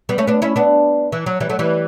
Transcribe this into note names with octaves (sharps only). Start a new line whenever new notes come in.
G3 B3
A3 C#4
B3 D4
C#4 E4
B3 D4
E3
F#3
E3 G3
F#3 A3
E3 G3